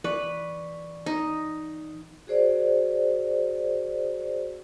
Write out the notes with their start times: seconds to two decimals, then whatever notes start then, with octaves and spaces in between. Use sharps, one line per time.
0.04 E3 B4 D5 C#6
1.06 D#4
2.27 F#4 G#4 C5 D5